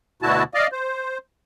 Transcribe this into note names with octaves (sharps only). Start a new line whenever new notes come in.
D2 B2 D3 E4 F#4 A5
D5 D#5 F5
C5